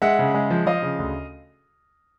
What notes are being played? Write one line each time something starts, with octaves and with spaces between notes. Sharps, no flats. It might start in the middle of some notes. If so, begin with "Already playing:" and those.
G#3 E5 F#5
C#3
G#3
F3
F3 D#5 F5
C#3
D2